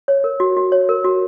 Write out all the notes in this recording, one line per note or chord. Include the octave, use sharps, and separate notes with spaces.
C#5
A#4
F#4
F#4
C#5
A#4
F#4